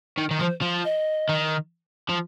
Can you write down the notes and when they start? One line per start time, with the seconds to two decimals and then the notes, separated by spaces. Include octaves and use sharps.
0.18 D#3
0.31 D#3
0.39 F3 C5
0.61 F3
0.84 D#5
1.29 D#3
2.09 F3